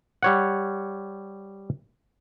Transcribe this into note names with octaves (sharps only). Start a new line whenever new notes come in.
G3 C#5 F#5